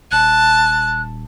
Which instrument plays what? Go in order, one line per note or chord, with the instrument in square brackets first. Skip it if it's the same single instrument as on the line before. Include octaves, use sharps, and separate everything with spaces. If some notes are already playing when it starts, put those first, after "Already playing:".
[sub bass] D#1 [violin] A5 [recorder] F#6